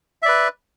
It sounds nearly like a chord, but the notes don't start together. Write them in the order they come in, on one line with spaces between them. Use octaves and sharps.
E5 D5 B4